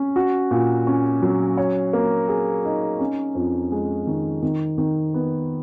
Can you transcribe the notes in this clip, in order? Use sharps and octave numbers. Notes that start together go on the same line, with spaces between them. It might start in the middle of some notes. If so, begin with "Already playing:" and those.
Already playing: C#4
F#4
A#2
C#4
F#3
C#5
A#3
G#4
D#4
C#4
F2
G#3
D#3
D#3
D#3
B3